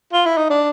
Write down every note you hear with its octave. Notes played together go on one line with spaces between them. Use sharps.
F4
E4
D#4
D4